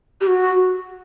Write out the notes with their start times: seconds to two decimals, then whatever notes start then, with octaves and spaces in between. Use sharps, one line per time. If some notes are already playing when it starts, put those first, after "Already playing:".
0.21 G4
0.27 F#4